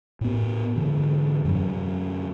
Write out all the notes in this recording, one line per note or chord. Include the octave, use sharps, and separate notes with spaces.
A2 B3
G#2 D3 E3
F#2 C3 F#3